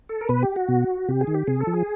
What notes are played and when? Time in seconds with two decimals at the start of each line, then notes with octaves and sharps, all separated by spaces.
0.09 A4
0.21 A#4
0.29 B2 B4
0.43 G4
0.56 F#4
0.69 B2
1.08 C3 G4
1.21 G#4
1.27 D#3
1.34 G4
1.47 C3 G#4
1.60 A4
1.67 F3
1.73 G#4